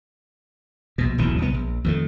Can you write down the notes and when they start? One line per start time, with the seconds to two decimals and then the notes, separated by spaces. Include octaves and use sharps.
0.98 A#1 B2
1.18 D1 B1 C#3 E3
1.38 C2 B3
1.54 A#1
1.84 F2 D#3 A3